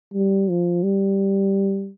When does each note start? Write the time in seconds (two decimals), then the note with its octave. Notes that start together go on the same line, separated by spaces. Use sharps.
0.14 G3
0.49 F3
0.83 G3